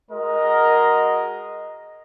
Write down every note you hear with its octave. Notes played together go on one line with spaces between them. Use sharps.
G#3 F#4 A#4 D#5